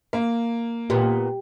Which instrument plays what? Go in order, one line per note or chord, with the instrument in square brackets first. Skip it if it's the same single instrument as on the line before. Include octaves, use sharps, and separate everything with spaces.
[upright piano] A#3
[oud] A#2 B3 [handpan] G4